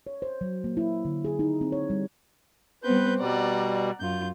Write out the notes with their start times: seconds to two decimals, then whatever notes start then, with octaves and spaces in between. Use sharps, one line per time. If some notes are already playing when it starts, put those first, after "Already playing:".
0.07 C#5
0.22 C5
0.41 F#3
0.64 A#3
0.77 E4
1.05 D3
1.25 G#4
1.39 D#4
1.61 C4
1.72 C#5
1.90 G3
2.84 G3 B3 C4 B4 G6
3.20 B2 G3 D5 F#5 A#5
4.00 F#2 F4 G6